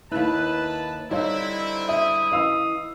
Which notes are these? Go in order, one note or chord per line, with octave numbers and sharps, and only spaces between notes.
D#2 E4 B4 A5
D3 G3 C4 D#4 E4 C#5 F5
E5 D#6
E3 D#5 F5 E6